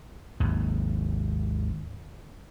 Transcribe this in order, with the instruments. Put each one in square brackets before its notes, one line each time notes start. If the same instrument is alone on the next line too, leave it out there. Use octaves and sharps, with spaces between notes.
[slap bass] G#1 D#2